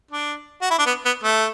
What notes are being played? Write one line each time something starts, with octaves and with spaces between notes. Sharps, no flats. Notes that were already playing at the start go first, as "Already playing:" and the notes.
D4
F#4
E4
D4
B3
B3
A3